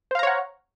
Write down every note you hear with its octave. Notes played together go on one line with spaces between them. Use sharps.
C5 C#5 F5 F#5 A#5